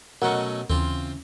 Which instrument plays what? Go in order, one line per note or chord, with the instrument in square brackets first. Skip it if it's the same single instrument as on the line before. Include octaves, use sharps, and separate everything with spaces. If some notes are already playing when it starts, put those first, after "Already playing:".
[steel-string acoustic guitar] B2 B3 D#5 [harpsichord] F#3 A3 C#4 [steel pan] A#4 F#5
[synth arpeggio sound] D#2 [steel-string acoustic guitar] C#3 E3 [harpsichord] C4 F4